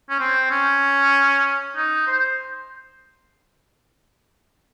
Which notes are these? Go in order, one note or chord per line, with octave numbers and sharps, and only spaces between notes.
C#4
C4
C#4
D#4
C5